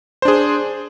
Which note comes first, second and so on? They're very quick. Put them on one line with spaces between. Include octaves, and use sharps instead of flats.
C5 D4 G#4